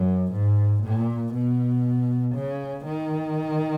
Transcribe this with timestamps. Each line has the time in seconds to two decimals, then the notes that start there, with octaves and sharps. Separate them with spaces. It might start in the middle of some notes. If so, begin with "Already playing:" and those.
Already playing: F#2
0.32 G#2
0.83 A#2
1.34 B2
2.35 C#3
2.85 D#3